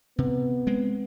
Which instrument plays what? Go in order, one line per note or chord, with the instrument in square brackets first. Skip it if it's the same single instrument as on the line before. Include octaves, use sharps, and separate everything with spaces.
[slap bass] C3 [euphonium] B3
[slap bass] G#3 C4